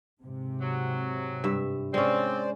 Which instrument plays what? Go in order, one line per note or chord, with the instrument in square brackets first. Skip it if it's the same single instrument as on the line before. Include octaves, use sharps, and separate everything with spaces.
[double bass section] G#2 C3
[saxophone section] F#3
[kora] G2 E5
[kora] G#3 C#4 [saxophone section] C4 [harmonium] C5 D5